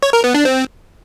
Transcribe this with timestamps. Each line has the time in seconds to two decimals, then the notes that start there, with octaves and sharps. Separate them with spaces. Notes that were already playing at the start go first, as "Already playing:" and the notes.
0.03 C#5
0.13 A#4
0.24 B3
0.34 D4
0.45 C4